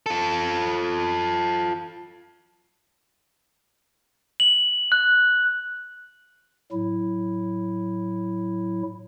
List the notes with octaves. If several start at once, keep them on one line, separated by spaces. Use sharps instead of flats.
F4 A4
F#7
F#6
A2 F#3 E4